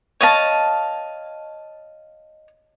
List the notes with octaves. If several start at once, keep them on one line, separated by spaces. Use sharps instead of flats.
C#5 D#5 F5 A5